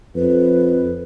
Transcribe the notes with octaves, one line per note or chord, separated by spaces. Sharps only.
F2 B4